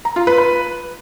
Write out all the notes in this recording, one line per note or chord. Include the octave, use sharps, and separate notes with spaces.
A#5
F4
B4
B4